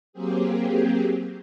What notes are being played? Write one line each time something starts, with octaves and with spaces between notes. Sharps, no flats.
F#3 A#3 C4 G4 G#4